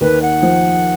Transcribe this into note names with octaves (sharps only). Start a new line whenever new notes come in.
D#2 D#3 B4
F#5
F3